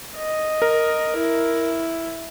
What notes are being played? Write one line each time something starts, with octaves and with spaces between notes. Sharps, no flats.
D#5
A#4
E4